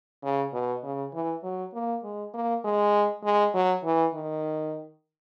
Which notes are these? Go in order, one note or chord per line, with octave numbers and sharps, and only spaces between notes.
C#3
B2
C#3
E3
F#3
A#3
G#3
A#3
G#3
G#3
F#3
E3
D#3